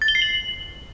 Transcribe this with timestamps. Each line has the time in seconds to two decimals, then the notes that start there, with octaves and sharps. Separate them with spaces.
0.02 A6
0.08 G7
0.15 C7
0.22 F#7